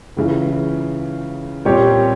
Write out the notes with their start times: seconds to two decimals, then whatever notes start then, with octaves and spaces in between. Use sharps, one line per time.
0.17 C#2 C#3 E3
1.65 A#2 G3 C4 G4 C#5